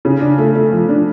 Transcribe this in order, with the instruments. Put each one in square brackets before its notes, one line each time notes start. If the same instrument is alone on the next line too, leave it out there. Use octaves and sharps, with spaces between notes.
[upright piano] C#3
D4
A3
A3
F3
D4